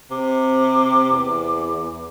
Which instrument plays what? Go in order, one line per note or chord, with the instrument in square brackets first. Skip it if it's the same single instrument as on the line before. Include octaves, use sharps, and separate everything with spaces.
[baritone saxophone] C3 [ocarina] D6
[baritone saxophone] E2